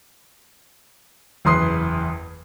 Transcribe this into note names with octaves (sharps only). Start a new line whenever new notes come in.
F#1 E2 B4 C6 D#6 C7